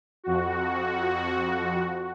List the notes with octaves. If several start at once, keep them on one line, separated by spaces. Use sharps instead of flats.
F2 F#4